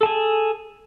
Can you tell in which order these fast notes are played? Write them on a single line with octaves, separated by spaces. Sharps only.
A4 A5 G#4